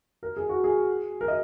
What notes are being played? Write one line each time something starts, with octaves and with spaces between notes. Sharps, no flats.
A#4
G#4
F#4
G#4
A#4
D#5